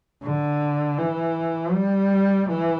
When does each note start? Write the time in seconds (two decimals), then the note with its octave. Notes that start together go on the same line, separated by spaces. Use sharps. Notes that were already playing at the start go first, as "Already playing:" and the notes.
0.23 D3
0.98 E3
1.73 G3
2.49 E3